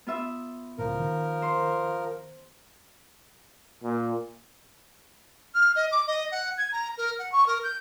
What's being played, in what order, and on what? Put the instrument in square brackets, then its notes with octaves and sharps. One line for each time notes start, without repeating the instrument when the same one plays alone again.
[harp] B3 F4 E5
[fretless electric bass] C#2 A2 [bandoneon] F3 A#4
[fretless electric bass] D#3
[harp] C5
[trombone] A#2
[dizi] F6
D#5
D6
D#5
F#5
G#6
A#5
A#4
F#5
C#6
A#4
G6